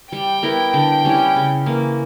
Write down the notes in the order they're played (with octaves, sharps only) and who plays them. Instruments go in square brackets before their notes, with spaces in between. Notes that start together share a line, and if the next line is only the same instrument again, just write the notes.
[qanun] G3 [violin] G5
[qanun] B3 E4 A#4
D3
G3 C#4 E4
C#3
E3 A#3